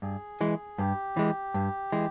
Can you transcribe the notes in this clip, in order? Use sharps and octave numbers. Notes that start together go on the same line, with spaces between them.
G2 G#4
E3 G#3
G2 G4
E3 G#3
G2
E3 G#3